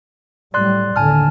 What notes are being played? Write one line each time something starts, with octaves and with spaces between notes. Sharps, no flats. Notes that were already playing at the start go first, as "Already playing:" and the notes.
A2 F#3 G3 D5 C6 F#6
D#2 A2 D3 G#5 A5 F6